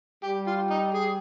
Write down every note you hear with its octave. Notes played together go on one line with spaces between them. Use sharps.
G3 G4
F4
D#4
G#4